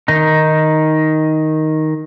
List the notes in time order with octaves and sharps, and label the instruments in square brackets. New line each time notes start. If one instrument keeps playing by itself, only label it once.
[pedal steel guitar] D#3 D#4